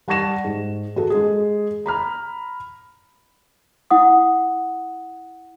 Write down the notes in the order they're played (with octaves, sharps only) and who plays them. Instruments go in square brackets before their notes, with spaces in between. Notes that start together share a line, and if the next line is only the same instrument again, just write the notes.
[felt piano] G3 F#5 A5 C#6 A#6 E7
G#2
F#4 G#4 A4
G#3 G#4
A#5 B5 F6
[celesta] E4 F#5 D#6